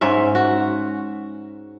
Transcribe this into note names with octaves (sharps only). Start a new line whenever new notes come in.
G#2 C#4 E5
F#4